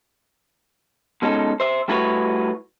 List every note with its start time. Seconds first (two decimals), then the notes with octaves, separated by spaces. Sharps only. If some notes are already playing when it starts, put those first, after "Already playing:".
1.22 B2 G#3 C#4 D#4 A4
1.60 C5 E5
1.88 G3 A3 E4 F#4 B4 C#5